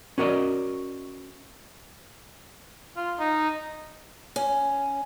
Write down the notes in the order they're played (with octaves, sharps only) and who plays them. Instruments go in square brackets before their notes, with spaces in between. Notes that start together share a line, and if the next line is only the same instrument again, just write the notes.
[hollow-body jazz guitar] C#4 F#4 A#4 D5 D#5
[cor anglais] F4
D#4
[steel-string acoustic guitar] C#4